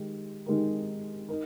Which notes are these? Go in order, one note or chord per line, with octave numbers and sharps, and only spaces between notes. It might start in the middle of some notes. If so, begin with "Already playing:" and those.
Already playing: D#3 G#3 D#4 G4
D#3 G#3 D#4 G4 A#4
D#4 A#4